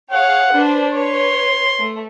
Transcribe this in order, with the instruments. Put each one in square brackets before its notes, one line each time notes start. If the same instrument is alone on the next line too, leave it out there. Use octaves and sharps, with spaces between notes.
[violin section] G#4 C#5 F5 [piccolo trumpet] F#5
[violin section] D4 B4 C5
[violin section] B4 C#5 [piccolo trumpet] C6
[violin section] A3